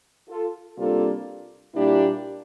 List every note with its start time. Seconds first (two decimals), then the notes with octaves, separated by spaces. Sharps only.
0.29 F4 A4
0.78 C3 G3 A#3 D4 F4 A4
1.74 A#2 G3 A#3 D4 E4 G4